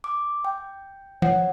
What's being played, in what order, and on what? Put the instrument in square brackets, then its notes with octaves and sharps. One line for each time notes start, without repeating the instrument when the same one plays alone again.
[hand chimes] D6
G5
[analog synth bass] F3 [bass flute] C#5 [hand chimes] F#5